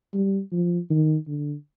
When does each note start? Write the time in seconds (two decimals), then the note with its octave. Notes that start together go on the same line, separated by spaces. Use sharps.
0.14 G3
0.53 F3
0.90 D#3
1.27 D3